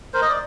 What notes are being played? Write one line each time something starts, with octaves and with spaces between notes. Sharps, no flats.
A#4 C5
D#5
D5